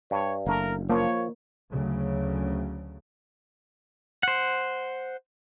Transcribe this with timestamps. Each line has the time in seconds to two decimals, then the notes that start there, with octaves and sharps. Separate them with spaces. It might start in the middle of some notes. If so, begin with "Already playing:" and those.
0.11 G2 C#5
0.47 F#1 A3 A#3 D4 A#4
0.90 F3 A#3 C#5
1.71 D2 C#3 F#3
4.23 C5 F#5